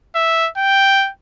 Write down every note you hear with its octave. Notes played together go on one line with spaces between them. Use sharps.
E5
G5